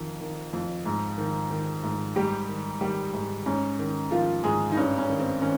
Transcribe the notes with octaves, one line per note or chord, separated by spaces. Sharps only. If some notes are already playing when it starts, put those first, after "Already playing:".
Already playing: F2 D#3
D#3
F2
G#2
D#3
D#3
G#2
G#2 G3 G4
D#3
D#3 G3 G4
G#2
G#2 C#4
D#3
D#3 F3 F4
G#2 G#3 G#4
D#4
G2 C#4
C#4
D#3
C4
D#3 C#4